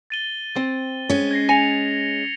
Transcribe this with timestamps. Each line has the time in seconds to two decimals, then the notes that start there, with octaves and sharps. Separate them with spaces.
0.10 A6 D#7 G7
0.56 C4
1.10 G#3 C#4
1.31 G#6 A#6 C7
1.49 G#5 A#6 C#7 F7